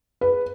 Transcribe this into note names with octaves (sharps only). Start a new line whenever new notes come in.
B4